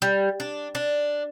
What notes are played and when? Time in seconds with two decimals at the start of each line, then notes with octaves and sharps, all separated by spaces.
0.02 G3
0.40 D4
0.75 D4